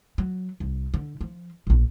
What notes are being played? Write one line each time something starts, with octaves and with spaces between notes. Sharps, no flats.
F#3
C2
D3
F3
E1 A#1